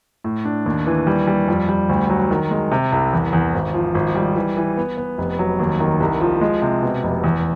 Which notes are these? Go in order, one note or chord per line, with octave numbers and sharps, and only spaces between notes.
A2
D4
D#2
E3
G3
G3
F2
G3
D2
F#3
D#3
G#3
C3
C2
E2
E2
G#1
F3
G#1
G3
E3
E3
B3
B3
F1
F#3
D#2
D#3
C2
F3
G#3
C3
B2
F1
E2